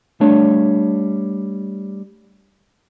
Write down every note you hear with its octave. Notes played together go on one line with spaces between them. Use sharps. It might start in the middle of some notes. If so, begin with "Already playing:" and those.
G3 A3 D4 C#5